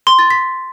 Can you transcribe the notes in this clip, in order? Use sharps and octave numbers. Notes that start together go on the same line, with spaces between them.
C6
A6
B6